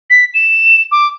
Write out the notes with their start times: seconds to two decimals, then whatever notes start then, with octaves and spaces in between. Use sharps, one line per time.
0.10 B6
0.34 E7
0.91 D6